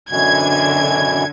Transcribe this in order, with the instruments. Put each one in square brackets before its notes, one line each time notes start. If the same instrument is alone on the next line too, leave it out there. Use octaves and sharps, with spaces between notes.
[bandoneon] F#2 B2 E3 [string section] D3 G#6